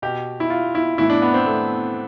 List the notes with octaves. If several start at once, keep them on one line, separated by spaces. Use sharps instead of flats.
B2 G4
E4
F4
E4
A2 E3 E4
D4
B3
C4
A3